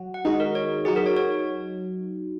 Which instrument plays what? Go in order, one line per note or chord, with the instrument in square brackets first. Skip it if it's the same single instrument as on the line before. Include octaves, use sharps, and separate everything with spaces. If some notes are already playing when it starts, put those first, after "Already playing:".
Already playing: [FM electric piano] F#3 F#4
[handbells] F#5
[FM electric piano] D#3 G#3 D#4 F#4 [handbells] D#5
[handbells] A#4
C#5
[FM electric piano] F#3 D#4 F#4 [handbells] G#4
[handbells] A#4
C#5
C#5